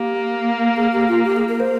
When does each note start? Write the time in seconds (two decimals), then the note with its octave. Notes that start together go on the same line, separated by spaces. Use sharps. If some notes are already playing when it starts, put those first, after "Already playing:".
Already playing: A#3 G4
0.76 G#4
0.93 G4
1.08 F4
1.25 G4
1.36 G#4
1.49 A#4
1.60 C5